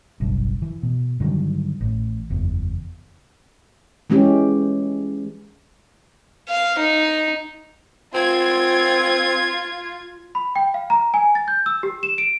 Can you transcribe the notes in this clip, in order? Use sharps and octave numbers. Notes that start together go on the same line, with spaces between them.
F#1 B1 G2
E3
B2
G2 D3 D#3 F#3
A1
F#1 E2
E3 G#3 C#4 G4
F5
D#4
C4 F4 G#6
B5
G5
F5
A#5
G#5
A6
G6
E6
G4
E7
D7